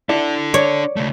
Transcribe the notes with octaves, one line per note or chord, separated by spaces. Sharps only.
D4 E4 A4 D5 E5
C#5 D5
C#2 A3